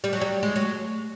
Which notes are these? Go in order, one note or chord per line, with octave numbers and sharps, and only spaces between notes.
G3
F#3
G3
G#3
F#3